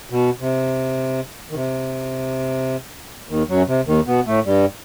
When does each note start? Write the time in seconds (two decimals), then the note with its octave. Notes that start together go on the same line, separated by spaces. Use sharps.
0.10 B2
0.39 C3
1.50 D#3
1.55 C3
3.29 D#2 D#3
3.49 F#2 F#3
3.67 C3
3.87 D#2 D#3
4.07 B2 B3
4.26 A2 A3
4.45 G2 G3